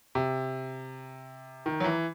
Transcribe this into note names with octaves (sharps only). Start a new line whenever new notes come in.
C3
D#3
F#3
E3